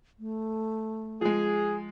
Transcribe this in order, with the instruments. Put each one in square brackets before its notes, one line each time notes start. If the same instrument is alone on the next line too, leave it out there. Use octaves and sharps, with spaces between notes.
[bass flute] A3
[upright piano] F3 G#3 [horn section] G#4